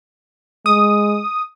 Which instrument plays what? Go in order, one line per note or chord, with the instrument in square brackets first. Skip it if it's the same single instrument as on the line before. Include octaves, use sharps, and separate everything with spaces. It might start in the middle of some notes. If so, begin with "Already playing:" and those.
[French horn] G#3 [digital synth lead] D#6